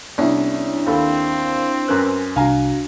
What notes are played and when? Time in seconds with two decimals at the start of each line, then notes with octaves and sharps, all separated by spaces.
0.18 C2 B3 C#4 D4 E4 C#5
0.87 D#2 C4 A4 F5 B5
1.88 F#2 C#4 A#4 B4 F#6
2.36 C2 D4 F#4 F5 G#5 A#5